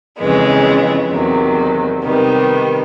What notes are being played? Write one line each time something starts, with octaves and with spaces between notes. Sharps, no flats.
F2 C#3 E3 G#3 B3
E2 C3 D#3 F#3
C3 D#3 G3 B3